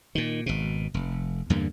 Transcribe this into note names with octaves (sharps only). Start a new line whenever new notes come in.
A#2 D#3
G#1 B2
F1
E2 G2 D3 A#3